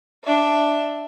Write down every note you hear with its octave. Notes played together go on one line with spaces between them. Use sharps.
D4 E5